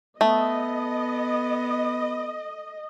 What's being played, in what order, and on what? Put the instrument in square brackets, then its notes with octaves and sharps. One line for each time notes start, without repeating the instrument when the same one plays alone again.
[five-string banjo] A3 [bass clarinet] B3 [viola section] D#5